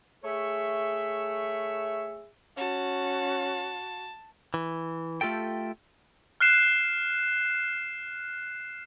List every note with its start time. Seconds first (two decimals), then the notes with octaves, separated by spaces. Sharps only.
0.24 A3 G#4 C#5 E5
2.57 C#4 F#4 A5
4.54 E3
5.21 A3 F4 G4 A4 G5
6.40 F6 F#6 C7 E7